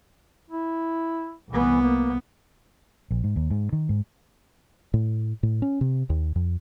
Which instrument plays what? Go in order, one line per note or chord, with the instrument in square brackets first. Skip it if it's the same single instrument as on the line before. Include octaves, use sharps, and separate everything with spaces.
[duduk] E4
[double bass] C2 B3 [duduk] E3
[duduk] A#3
[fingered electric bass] A#1
G#2
D#2
G#2
D#3
G#2
A2
A2
C#4
C3
D#2
F2